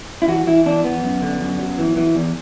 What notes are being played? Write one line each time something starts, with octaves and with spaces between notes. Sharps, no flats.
E4
E3 F#4
E3 E4
E2 D4
E2 B3
F#2
D3
F#2
F#3
E3
E3
E2